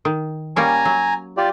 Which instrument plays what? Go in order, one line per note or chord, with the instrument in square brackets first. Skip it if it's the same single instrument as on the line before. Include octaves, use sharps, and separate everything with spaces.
[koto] D#3
[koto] G3 A#3 C#4 [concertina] G#5 A#5
[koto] F#3
[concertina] F4 G4 D5